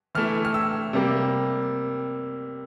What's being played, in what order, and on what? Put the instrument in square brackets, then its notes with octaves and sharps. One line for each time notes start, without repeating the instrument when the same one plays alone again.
[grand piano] E3 A3 E4 F6
F6
E6
C3 G3 A#3